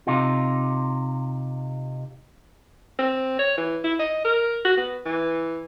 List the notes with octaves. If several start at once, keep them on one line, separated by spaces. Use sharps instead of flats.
C3 D#4 F4
C4
C#5
E3
E4
D#5
A#4
F#4
B3
E3